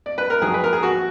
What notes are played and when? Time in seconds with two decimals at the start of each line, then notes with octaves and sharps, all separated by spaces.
0.06 D5
0.18 B4
0.30 A#4
0.42 F2 D#3 F#3 G#4
0.54 B4
0.64 A#4
0.73 G#4
0.83 F#4